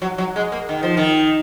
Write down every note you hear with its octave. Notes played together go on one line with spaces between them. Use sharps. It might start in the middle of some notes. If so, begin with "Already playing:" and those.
F#3
F#3
G#3
A#3
D#3
F3
D#3